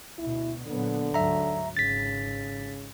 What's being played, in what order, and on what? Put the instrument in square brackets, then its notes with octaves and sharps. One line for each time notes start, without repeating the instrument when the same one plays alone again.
[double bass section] D2 B2 [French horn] E4
[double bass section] A#2 F#3 B3 [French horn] D3
[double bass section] D2 G#2 F#3 [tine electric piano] E5 A#5
[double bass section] G#1 [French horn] C#3 [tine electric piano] A6 B6